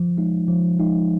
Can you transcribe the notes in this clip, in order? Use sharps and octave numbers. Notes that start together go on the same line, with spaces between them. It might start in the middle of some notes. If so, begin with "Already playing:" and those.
Already playing: F3
G#3 D#4
F3
G#3 D#4